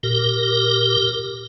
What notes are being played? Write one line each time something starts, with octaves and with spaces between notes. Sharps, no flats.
A#2 G4 A#4